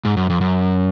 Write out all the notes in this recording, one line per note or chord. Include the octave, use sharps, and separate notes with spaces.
G#2
F#2
F2
F#2